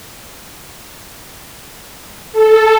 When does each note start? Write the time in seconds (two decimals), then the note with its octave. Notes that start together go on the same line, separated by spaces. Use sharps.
2.33 A4